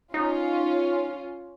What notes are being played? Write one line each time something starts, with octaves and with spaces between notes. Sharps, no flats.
C#4 D#4 F4